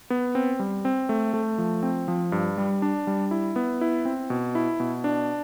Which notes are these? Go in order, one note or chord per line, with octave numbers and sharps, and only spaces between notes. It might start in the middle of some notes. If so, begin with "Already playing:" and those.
B3
C4
G3
C4
A3
A3
F3
C4
F3
G2
G3
D4
G3
E4
B3
E4
C4
B2
E4
B2
D4